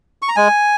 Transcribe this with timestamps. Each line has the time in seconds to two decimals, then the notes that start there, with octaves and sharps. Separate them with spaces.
0.22 C#6
0.28 A#5
0.36 G#3 G#5